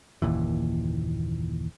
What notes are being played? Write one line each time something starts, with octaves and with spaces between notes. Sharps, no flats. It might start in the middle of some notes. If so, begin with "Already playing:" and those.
F#1 D#2 A#2 E3